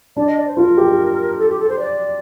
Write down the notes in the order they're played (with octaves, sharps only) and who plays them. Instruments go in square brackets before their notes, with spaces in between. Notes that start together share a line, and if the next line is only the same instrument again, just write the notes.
[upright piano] D4 [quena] D5
[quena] D#5
D5
C5
[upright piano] F4 [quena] A#4
[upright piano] G4
[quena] A4
G4
A4
C5
D5